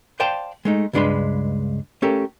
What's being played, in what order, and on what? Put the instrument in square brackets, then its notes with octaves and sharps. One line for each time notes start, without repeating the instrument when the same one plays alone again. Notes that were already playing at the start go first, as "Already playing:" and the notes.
[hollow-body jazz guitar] C5 D5 F5 G5 A5 C6
G#3 A3 D#4
C#2 G2 G#3 D4 B4 C6
A3 C#4 G4 A4 A#4